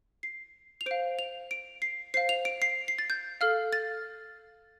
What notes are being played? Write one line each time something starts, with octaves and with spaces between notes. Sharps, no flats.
C7
F7
C5 F5 D7
F7
D7
C7
C5 F5 C7
F7
D7
C7
C7
A6
G6
A4 F5 F6
A6